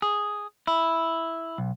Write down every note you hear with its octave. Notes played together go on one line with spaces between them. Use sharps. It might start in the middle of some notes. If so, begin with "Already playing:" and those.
G#4
E4
B1